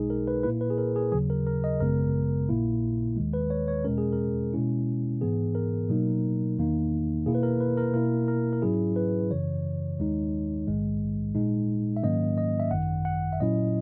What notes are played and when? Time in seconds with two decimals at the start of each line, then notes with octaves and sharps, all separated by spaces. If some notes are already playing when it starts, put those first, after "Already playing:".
Already playing: B1 B2 G#3 D#4 G#4
0.10 A#4
0.28 B4
0.43 A#2 A#3 E4 B4
0.61 B4
0.70 G#4
0.78 A#4
0.96 G#4
1.12 D#2 C#3 F#3 G#4
1.30 A#4
1.47 A#4
1.64 D#5
1.80 G#1 F#2 C#3 G#3 B3 A#4
2.49 A#1 A#2 A#3 E4
3.17 D#2 D#3 G#3
3.33 B4
3.50 C#5
3.68 C#5
3.84 E2 B2 G#3 C#4 A#4
3.98 G#4
4.13 A#4
4.53 B2 G#3 C#4 E4
5.21 G#2 E3 B3 G#4
5.55 A#4
5.89 B2 F#3 A#3 D#4
6.58 E2 D#3 A#3 D#4
7.26 B2 A#3 E4 G#4
7.35 B4
7.43 A#4
7.60 B4
7.77 A#4
7.94 B2 A#3 E4 A#4
8.28 A#4
8.53 A#4
8.62 G#2 F#3 C#4 E4 G#4
8.96 B4
9.30 F#2 C#3 E3 C#5
9.98 D#2 D#3 G#3 D#4
10.67 A#1 G#2 D#3 G#3
11.35 A#2 G#3 D#4
11.97 E5
12.03 G#2 D#3 F#3 A#3 C#4 D#5
12.38 D#5
12.60 E5
12.71 G#1 F#2 D#3 F#5
13.05 F#5
13.33 E5
13.40 A#2 F#3 C#4 E4 D#5